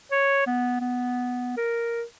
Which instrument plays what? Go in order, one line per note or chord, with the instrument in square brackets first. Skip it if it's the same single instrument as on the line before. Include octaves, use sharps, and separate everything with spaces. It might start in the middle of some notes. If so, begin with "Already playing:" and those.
[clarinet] C#5
B3
B3
A#4